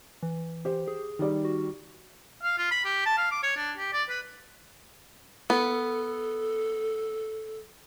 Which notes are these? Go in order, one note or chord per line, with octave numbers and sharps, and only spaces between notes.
E3
G4 C5
G#4
D#3 G3 D5
F#4
F5
F4
B5
G4
A5
F5
D6
C#5
D4
G4
D5
B4
B3 A4